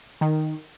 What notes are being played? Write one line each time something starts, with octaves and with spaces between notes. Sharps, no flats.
D#3